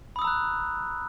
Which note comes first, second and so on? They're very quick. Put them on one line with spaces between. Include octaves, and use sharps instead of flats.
B5 D#6 E6 A#5 F#6